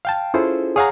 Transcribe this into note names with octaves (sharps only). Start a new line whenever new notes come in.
F5 G5 A5
C#4 E4 F4 G#4 A4 C5
G#4 C#5 F5 F#5 G#5 A#5